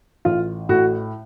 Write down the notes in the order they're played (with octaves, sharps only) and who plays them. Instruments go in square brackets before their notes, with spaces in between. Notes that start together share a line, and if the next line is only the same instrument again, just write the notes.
[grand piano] A1 F4
A2 F#4